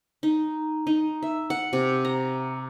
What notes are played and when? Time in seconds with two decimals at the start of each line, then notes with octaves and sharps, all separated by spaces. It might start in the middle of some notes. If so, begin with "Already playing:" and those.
0.23 D#4
0.87 D#4
1.23 E5
1.50 F#5
1.73 C3
2.05 A#5